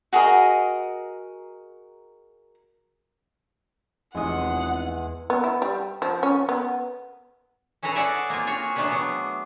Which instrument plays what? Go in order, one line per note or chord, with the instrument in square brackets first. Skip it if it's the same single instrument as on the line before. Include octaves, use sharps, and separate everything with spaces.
[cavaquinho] F#4 G#4 A#4 D#5
[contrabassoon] F1 [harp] E2 [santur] G#3 D#6 [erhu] F#5
[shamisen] B3
E4
G3
F3
C#4
B3
[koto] C#4 G#4 A4 B4 A#5
G#4 A4 C#5 D5 E5 F#5
A#3 C4 F4 G#5
F#4 G#4 C#5 F5
C3 F#3 A3 D4 G#4 B4
F#3 B3